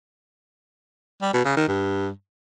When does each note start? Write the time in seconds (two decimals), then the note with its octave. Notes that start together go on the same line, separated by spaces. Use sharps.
1.22 G3
1.33 B2
1.45 C#3
1.56 D#3
1.68 G2